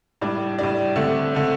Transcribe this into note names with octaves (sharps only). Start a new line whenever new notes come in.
A2 G3 D4 D5
A2 G3 D4 D5
D3 A3 C4
D3 A3 C4